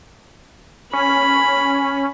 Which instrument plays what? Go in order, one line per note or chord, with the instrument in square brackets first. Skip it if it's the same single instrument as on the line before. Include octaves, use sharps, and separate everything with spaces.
[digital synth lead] C#4 [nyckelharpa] B5